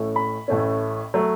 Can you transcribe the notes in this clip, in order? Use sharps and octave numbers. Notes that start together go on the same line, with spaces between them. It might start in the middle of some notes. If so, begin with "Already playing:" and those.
Already playing: A1 A2 A3 C#4
B5
A1 A2 A3 C#4
F#3 A3